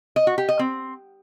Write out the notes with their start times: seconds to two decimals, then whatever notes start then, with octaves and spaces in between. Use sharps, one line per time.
0.16 D#5
0.27 F#4
0.38 G4
0.49 D#5
0.59 C4